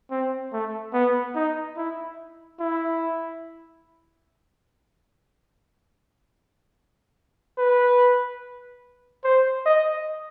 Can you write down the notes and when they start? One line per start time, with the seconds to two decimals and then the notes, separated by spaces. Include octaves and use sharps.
0.11 C4
0.53 A3
0.94 B3
1.35 D#4
1.77 E4
2.60 E4
7.58 B4
9.24 C5
9.66 D#5